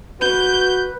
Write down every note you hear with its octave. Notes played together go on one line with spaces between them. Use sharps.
F#4 B4 G6